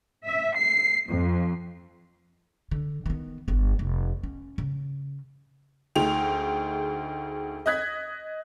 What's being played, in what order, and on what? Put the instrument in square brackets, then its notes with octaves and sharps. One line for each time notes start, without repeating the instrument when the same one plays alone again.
[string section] E5
C7
F2
[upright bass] D3
D#3 B3
G1 B3
F1
C#4
C#3
[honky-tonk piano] D2 D#4 G#4 G5 F7
D#5 D#6 F#6 G#6 B6